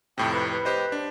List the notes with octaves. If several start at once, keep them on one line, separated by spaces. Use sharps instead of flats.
F2 A2 C3 G5
B4
B4
G4 C5 D#5
D4